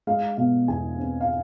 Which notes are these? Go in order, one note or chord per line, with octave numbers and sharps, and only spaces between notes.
G#3 F5
B2 F5
E2 G#5
C4
F5